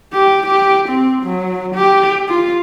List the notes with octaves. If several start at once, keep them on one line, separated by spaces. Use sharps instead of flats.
G4
G4
C4
F#3
G4
F4